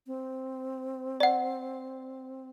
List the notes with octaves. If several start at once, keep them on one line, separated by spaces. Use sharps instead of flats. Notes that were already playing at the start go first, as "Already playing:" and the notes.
C4
D5 F#5